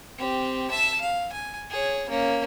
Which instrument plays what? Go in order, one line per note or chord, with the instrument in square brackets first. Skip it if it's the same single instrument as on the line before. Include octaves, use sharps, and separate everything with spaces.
[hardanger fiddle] C4 G4
E5 A5
F5
G#5
G#4 C#5
A#3 C#4